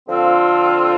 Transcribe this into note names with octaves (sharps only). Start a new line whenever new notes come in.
D3 F3 C4 F4 A4